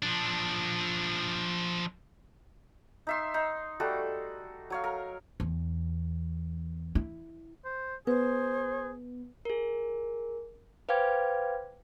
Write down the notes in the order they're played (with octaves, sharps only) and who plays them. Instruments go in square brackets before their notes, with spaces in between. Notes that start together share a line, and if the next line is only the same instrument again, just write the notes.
[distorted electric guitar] F3 D4
[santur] D#4 E5 C6
D#4
G3 A3 F#4 A4
F#3 C#5 F5
A#4
[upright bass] E2
E4
[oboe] C5
[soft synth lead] B3 [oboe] G#4 [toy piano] B4 [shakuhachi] C5
[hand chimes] G#4 A#4
B4 C5 F5 G5 D6 G#6